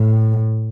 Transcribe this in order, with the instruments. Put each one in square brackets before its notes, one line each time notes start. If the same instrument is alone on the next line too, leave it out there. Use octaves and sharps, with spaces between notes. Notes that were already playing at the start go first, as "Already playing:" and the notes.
Already playing: [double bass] A2